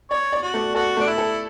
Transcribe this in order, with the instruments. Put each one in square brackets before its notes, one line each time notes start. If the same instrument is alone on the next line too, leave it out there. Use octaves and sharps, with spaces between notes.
[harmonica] C#5 [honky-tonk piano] D5
[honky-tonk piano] D5
[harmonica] F#4
[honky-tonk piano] A3
[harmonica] F#4 [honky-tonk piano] A4
[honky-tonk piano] A3 [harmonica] D4
[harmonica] E4
[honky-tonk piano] A4